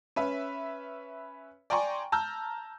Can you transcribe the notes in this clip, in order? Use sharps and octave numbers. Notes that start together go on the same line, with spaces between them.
C#4 B4 E5
D5 G5 G#5 A#5 C6 C#6
A5 A#5 E6 F6 G6